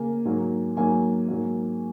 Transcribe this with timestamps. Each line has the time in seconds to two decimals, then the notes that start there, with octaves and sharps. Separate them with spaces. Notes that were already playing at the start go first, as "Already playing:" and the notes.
Already playing: C#3 A#3 G#5
0.25 G#2 F#3 A#3
0.77 G#2 F#3 A#3 G#5
1.28 G#2 F#3 A#3